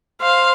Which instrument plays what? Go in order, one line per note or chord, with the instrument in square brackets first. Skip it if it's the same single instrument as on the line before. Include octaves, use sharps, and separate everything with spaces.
[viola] C5 [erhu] F5